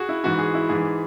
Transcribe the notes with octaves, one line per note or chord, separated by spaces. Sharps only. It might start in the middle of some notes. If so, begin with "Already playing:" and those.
Already playing: F#4 G#4
E4
G#2 E3 F#4
G#4
E4
G#2 E3 G#4